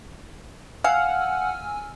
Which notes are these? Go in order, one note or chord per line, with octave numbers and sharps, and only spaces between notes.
F5 F#5 G#5 E6 F6